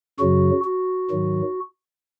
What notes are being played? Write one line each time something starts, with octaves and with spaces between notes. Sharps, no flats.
F#2 C#3 F#3 F#4
F#4
G#2 D#3 F#3